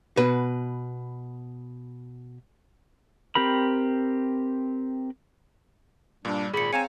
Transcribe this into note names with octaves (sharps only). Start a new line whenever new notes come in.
B2 B4
C4 G4 A#4 B5
G2 A#2 G3 D4
G#1 A#2 G#4 B5 C#7
C4 C#5 F5 G#5 A#5 C#7 E7